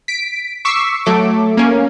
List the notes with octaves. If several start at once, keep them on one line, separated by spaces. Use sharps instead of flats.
B6 D7
C#6 D6 E6 B6 C7
F#3 A3 D6
A#3 C#4